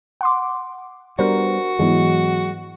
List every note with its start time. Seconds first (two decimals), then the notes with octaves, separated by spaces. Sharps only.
0.21 F#5 C6 D6
1.19 G3 B3 D4 F#4 A#4 C5
1.79 G#2 E3 F#3 G#3 B3